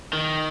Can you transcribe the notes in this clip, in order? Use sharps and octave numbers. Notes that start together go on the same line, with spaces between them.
D#3